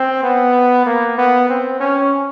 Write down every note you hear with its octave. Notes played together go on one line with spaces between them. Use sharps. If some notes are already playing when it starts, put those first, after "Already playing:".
Already playing: C4
B3
A#3
B3
C4
C#4